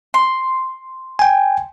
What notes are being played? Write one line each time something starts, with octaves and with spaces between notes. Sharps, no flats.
C6
G5 G#5